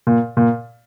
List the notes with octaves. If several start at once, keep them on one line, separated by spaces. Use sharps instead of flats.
A#2
A#2